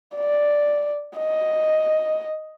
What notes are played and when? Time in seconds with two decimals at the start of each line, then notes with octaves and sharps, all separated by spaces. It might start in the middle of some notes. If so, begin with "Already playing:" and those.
0.16 D5
1.18 D#5